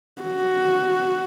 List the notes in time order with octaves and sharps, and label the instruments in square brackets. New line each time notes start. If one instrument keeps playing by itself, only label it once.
[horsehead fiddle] F#4